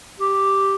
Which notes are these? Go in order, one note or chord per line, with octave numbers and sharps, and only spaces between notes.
G4